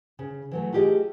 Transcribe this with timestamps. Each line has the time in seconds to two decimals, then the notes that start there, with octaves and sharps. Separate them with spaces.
0.19 C#3
0.52 E3 F#3 A3
0.72 A3 F4 G4 G#4 D#5